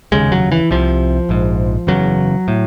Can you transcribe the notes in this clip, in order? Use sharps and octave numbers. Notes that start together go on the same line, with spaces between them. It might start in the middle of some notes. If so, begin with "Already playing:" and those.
F1 D#2 C#3 G#3
F#3
E3
C2 C3 F3
A#1 G#2
F#1 E2 C#3 F#3
A2